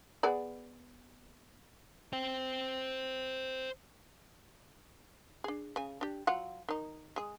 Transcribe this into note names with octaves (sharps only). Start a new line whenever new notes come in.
B3 G#4 D5
C5 G5
D4 G#4
C#3 G#5
D4 G4
F#3 F4 F#5
D#3 D#4
G#3 G#4